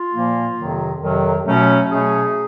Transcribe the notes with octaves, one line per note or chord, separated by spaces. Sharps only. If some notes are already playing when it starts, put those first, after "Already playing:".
Already playing: F4
A#2 F3 A#3
F2 C3 D#3 F#3
F2 C3 D#3 F#3
B2 F#3 A3 C#4
B2 F#3 A3 C#4 G#4